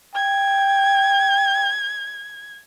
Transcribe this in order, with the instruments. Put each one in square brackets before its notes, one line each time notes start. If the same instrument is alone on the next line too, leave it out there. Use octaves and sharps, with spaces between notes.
[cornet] G5 [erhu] G#6